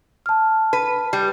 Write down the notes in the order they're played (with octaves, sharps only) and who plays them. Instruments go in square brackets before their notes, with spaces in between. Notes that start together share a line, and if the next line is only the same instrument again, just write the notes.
[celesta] A5 F6
[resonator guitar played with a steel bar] B4
G3